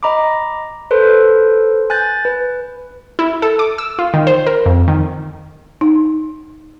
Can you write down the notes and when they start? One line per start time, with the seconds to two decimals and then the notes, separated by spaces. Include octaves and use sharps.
0.03 D#5 A#5 B5 D6
0.91 A4 B4 C5 C6
1.90 G#5 F#6 G6 A6
2.25 B4
3.19 E4
3.42 A4
3.59 D6
3.78 E6
3.99 F4
4.14 D#3
4.27 C5
4.47 A#4
4.66 F2
4.88 D#3
5.81 D#4